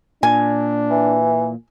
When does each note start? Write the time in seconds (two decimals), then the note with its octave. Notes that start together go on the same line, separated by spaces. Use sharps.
0.23 A#2 D4 G#5
0.90 E3